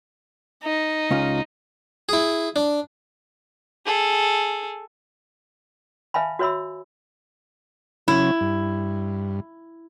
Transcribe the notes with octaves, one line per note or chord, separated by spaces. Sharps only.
D#4
C#2 C#4 F4
E4 G#4
D4
G#4 A4
B4 E5 F5 G#5 A5 B5
F#4 B4 C#5 E5 B5 E6
C#3 F#3 C#4 E4
G2